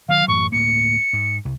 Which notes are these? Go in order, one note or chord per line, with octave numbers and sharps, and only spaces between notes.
D#3 F#3 F5
F#2 A2 E3 C#6
D2 A2 A#3 C#7
G#2
C2